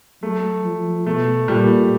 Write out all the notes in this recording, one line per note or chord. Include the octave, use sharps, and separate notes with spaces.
F#3 A3
F3
B2 A3
A#2 G3